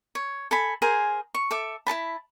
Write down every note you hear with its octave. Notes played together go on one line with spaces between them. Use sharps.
C#5
A4 G#5 B5
G#4 A#4 C5 G#5
C#6
A4 E5 D6
E4 A4 A5 B5